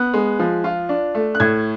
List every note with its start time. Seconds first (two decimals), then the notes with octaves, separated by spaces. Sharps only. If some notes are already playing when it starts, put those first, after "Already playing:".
Already playing: B3 F#6
0.14 G#3
0.39 F3
0.64 F4
0.89 D4
1.15 A3
1.35 F#6
1.40 A2 G#6